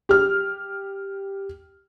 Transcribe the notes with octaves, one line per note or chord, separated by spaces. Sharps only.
G4 F6